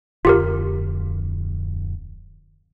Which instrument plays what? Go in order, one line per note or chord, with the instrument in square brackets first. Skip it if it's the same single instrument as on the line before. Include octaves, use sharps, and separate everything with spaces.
[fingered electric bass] D1 F2 D3 [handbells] F4 G4 A#4